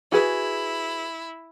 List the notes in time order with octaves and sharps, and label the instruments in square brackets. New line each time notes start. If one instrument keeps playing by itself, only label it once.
[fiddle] E4 [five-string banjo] F#4 G#4 B4